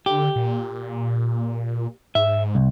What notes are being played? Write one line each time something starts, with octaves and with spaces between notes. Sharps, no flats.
D3 G4
A#2
G#2 E5
C2